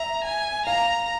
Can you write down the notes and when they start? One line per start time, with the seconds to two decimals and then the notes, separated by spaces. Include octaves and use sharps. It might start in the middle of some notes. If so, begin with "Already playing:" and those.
Already playing: E5 A#5
0.24 G#5
0.66 F5 A#5